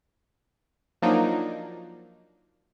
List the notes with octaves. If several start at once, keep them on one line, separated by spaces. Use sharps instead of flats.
F3 F#3 A#3 D4 D#4